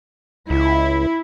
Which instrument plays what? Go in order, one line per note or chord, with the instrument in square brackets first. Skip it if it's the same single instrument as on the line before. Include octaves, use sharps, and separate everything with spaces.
[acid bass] C#2 [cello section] E4